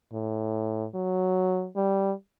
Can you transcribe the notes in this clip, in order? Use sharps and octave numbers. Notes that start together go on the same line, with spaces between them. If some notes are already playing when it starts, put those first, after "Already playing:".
A2
F#3
G3